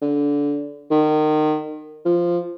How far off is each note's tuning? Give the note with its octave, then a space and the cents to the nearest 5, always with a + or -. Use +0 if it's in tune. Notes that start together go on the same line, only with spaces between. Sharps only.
D3 -20
D#3 -25
F3 -5